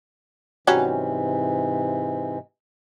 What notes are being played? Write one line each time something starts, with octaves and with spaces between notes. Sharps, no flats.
G#2 C3 E3 F#3 G3 C#4